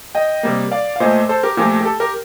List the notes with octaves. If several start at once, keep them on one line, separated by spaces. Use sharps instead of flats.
D#5 G5
C3 G3 A#3
D5 F5
F5
A#2 A3 C5 D#5
A4 C5
G4 A#4
A#2 F3 A3 G4 A#4
G4
A4
G4 A#4